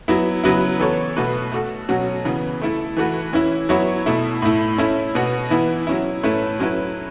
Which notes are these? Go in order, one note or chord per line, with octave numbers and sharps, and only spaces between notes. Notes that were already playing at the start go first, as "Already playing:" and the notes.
F#3 B3 E4
C#3 F#3 B3 E4 B4
E3 B3 A4 C#5
B2 A3 F#4 B4
A3 F#4 A4
B2 F#3 C#4 F#4
C#3 E3 B3
A3 E4 A4
E3 A3 F#4 B4
E3 C#4 E4
F#3 B3 E4 C#5
B2 A3 E4
A2 A3 E4
A3 C#4 E4
B2 B3 F#4
E3 B3 E4
F#3 C#4 E4
A2 A3 C#4 E4 B4
F#3 C#4 E4 B4